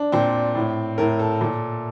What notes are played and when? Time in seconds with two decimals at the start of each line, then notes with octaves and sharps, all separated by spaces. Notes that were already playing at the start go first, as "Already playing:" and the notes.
Already playing: D4
0.12 A#2 C4
0.55 A2
0.98 A2 A#4
1.19 A4
1.41 A#2